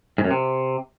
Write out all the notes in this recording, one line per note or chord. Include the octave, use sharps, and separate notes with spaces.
G#2
F#2
C3